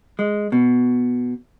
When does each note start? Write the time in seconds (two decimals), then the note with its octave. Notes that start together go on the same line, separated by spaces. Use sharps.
0.19 G#3
0.52 B2